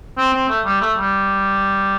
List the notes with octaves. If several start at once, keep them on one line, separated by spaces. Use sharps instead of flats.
C4
C4
A3
G3
A3
G3